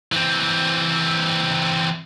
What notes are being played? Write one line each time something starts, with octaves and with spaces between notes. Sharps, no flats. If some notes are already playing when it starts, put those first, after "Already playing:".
E3 C4